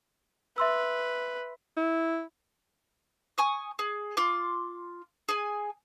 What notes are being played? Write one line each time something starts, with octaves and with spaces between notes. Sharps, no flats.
B4 E5 C6 E6
E4
G#5 C#6 D#6
G#4
F4 C6 D6
G#4 G#5